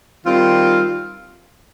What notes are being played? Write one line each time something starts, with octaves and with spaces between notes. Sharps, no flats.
D#3 G3 C4 F4